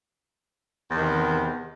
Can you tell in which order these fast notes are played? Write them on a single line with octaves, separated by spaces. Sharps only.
E2 D#3 C3